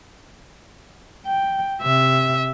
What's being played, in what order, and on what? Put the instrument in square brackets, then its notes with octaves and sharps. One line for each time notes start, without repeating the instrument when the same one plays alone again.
[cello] G5
[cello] C3 [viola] E5